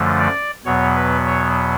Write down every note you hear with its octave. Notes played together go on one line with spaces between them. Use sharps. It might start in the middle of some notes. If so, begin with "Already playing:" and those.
Already playing: F#2 D3 F3 A3
D5
E2 B2 F#3 B3 C#5
B4
C#5